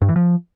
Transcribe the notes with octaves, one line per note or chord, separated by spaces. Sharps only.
G2
E3
F3